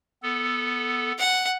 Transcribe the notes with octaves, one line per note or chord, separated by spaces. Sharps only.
B3 A4
F#5